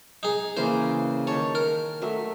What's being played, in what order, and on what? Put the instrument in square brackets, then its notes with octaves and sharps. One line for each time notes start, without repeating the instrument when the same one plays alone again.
[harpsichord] D#4 G#4
[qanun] C#3 E3 A#3 [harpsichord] C5
[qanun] D#3 A5 [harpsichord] C#5
[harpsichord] A#4
[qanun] F#3 A3 E5